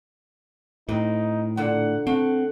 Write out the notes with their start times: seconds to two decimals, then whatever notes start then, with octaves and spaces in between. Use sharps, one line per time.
0.89 A2 C4 D#4 G4 B4
1.57 A#2 D3 A#3 F#5
2.07 A3 C4 F#5